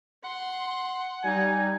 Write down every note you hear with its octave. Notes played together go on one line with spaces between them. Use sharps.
F#5 C6
G3 D#4 G#5